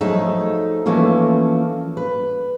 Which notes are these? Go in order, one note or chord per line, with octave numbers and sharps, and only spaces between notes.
F3 F#3 A3 D#4 G#4 E5
E3 F3 A3 A#3 C#4 F4
B4